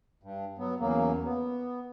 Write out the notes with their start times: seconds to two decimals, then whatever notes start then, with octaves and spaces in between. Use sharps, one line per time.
0.23 G2
0.58 F#3 B3
0.80 E2 C#3 F#3 A#3
1.25 B3